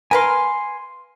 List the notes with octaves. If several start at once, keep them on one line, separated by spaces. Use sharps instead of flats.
A#4 B4 F5 G#5 C6